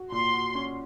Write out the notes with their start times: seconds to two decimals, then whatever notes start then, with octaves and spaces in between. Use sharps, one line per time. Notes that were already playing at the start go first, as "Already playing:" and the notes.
Already playing: F#4
0.12 A#2 C6
0.33 F#4
0.55 C#4